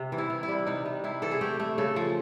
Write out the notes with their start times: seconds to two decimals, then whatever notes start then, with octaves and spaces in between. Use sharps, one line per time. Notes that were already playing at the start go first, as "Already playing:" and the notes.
Already playing: C3
0.12 E3
0.18 E4
0.30 C3
0.43 E4
0.48 G3
0.67 C3 D#4
0.85 C3
1.04 C3 E4
1.22 E3 A4
1.31 G#4
1.41 A3 G4
1.60 A3
1.78 C#3 A4
1.96 F3